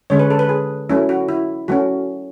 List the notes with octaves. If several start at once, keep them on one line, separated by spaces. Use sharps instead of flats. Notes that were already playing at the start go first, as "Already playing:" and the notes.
D3 G#3 C#4 C#5
B4
A4
B4
G#4
F#3 A3 C#4 E4
F#4
E4
F#3 A3 C#4 F#4